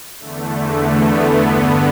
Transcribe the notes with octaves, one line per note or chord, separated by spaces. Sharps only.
E2 D3 A3
A3
B3
A3
G2 D3 B3